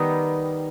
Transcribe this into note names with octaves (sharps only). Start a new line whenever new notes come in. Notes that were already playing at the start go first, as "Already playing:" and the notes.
Already playing: D#3 G3 B3 D#4